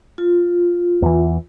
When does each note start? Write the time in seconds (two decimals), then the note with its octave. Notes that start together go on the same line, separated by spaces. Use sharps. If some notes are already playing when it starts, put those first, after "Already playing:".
0.18 F4
1.02 E2 E3